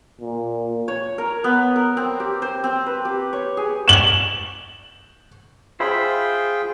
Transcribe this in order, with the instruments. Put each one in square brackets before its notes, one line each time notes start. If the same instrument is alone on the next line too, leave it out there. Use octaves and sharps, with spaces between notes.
[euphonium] A#2
[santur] C#5
A#4
B3
A#4
C4
G4
C5
C4
B4
G4
C#5
G#4
[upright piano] E7 F#7
[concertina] F4 G#4 G5 [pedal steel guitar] C5 E5 B5